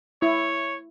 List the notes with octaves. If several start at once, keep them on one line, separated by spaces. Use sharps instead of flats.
E4 C#5